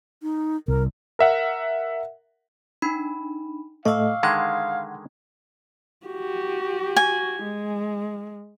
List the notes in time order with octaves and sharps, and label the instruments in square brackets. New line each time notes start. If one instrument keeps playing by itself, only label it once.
[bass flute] D#4
[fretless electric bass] C2 [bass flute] A#4
[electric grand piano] A#4 E5 F#5
[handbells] D4 D#4 B5
[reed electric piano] A2 A3 D#5 [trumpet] F5 [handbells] C#6 D6 E6
[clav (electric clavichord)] D3 D#3 G#3 [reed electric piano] F#5 [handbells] G5 G#6
[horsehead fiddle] F#4 G4
[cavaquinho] G#5
[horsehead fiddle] G#3